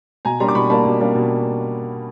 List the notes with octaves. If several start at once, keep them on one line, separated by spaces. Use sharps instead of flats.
B2 G#5 A#5
G3 A#3 D4 A#5 C6
D6
B2 B5 C#6
G3 A#3 D4 A5 B5
B2
G3 A#3 D4
B2